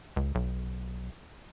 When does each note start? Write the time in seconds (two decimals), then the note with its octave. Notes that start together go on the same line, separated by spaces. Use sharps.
0.16 C#2
0.35 B1